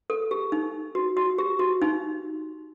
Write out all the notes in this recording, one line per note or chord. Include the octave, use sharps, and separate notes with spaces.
A4
G4
D#4
F#4
F#4
G4
F#4
D#4